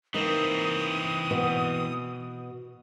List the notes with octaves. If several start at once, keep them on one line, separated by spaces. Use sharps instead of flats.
E3 A#3 C4 D#4 D#6
B2